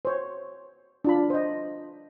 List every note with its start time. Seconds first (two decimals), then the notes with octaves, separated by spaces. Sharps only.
0.05 C5 C#5
1.04 D4 F4 B5
1.30 C5 D#5